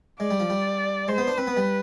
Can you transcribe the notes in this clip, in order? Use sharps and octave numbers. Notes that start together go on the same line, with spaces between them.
G#3 D5
G3
F3
G3
G#3 C5
B3
D4
C4 B4
B3
G3